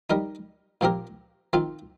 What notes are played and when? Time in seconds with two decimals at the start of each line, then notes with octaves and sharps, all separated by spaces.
0.10 G3 D#4 A#4
0.81 A#2 F3 C4 G4 A#4
1.53 D#3 C4 F4